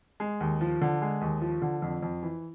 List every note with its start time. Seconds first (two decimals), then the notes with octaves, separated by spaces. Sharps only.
0.20 G#3
0.40 D#2
0.61 F3
0.81 D3
1.02 G#3
1.21 D#2
1.41 F3
1.62 D3
1.82 F2
2.02 F2
2.23 E3